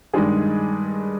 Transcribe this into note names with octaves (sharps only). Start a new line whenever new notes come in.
G2 D#3 G#3 D4 G#4